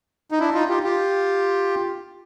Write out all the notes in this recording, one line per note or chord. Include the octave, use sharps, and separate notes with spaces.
D#4
D4 E4
D#4 F4
F4 G4
F4 G4